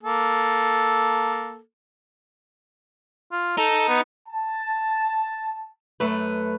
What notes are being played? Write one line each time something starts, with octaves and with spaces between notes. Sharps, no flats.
A#3 A4
F4
D#4 A4
B3
A5
F#2 A3 B4